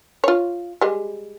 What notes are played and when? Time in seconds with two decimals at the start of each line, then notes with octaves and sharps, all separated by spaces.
0.24 F4 C#5
0.81 G3 G#3